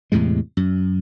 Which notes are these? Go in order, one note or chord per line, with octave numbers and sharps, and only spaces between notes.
E2 A2 C3 G#3
F#2